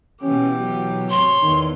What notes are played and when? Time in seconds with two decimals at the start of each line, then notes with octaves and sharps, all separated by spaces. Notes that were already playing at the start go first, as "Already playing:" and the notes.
0.22 B2 E3 C#4 G4
0.59 F#3
1.10 A2 C3 C#5 C6
1.42 E2 D#3 E3